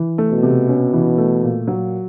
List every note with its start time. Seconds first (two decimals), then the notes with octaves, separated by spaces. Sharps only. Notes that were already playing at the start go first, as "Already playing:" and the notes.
Already playing: E3
0.18 A3
0.31 B2
0.43 C3
0.68 C#4
0.93 E3
1.18 A3
1.43 A#2
1.68 F#3